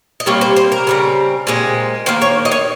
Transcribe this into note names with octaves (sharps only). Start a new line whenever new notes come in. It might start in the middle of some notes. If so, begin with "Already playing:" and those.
D#5
C3 G3 A#3 C#5
C5
C5
A#4
C#3 G3 C4
A#2 G#3 C4
D#3 A#3 C5
C#5
D#5
C#5